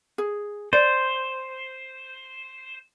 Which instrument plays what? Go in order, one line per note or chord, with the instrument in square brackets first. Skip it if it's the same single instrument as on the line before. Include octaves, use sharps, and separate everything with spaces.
[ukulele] G#4
[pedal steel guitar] C5 [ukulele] D5